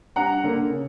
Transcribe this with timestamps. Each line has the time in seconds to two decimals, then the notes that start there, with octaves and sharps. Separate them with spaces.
0.16 G2 F#5 A#5
0.44 D3 A#3
0.70 C#3